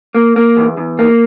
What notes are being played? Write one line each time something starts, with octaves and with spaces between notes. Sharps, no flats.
A#3
A#3
E2
E2
A#3